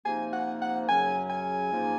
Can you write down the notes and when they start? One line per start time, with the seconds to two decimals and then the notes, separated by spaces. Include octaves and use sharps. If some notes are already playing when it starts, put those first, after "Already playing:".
0.05 C3 F3 A#3 D#4 G#5
0.33 F#5
0.61 F#5
0.88 F#2 C#3 F#3 C#4 G#5
1.30 G#5
1.71 G#2 F3 A#3 D#4